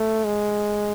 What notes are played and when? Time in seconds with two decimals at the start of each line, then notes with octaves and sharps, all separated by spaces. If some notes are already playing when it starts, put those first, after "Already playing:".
Already playing: A3
0.25 G#3